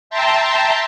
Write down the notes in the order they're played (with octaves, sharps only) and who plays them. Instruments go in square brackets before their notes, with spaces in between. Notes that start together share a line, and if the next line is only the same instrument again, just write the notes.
[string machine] E5 G5 A5 A#5 C6